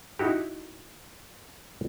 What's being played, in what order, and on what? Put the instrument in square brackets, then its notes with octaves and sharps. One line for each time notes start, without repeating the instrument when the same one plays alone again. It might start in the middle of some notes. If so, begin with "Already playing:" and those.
[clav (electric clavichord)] D#4 E4 F#4 G4